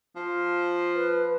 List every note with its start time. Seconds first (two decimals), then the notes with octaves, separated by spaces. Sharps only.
0.16 F3
0.96 B4